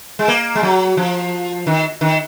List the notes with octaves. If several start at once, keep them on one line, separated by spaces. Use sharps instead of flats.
G#3
A#3
G#3
F#3
F3
D#3
D#3